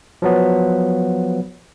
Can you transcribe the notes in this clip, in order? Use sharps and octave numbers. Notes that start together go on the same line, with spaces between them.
F3 F#3 B3